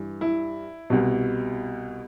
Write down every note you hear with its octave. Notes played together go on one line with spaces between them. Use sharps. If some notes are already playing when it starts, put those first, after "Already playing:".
Already playing: G2 E3
E4
C2 B2